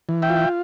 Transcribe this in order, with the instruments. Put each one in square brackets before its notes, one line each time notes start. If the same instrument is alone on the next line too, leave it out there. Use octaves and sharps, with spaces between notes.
[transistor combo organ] E3
E5 G5
F4